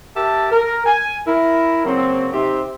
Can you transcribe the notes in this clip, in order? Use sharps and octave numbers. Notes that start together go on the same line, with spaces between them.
G4 A#4 E5 A5
A#4
G#5
E4 A#4
C#3 F#3 A#3 C4
C3 C4 D#4 G4 C5 E5